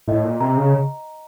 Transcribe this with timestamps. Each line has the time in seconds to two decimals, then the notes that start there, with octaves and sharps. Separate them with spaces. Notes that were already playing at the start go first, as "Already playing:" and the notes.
0.08 A2 D#5
0.24 A#2
0.40 C3 A#5
0.57 C#3